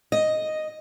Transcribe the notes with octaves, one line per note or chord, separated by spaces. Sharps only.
D#5